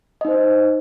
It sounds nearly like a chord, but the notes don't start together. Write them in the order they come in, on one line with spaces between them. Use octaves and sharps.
D#5 D#4 C5